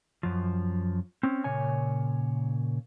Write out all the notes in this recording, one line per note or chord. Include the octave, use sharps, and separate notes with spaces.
F#2 F3
C4 C#4
A#2 C#3 C#5 G#5